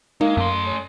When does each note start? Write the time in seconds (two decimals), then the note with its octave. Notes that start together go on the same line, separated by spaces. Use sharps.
0.21 G#3 A#3 D#4
0.37 F#2 A3 C6
0.66 C#4